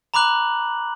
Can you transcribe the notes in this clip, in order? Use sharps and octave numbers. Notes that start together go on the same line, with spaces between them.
A#5 B5 D6 F#6 F#7